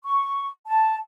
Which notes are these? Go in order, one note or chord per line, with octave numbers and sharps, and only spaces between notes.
C#6
A5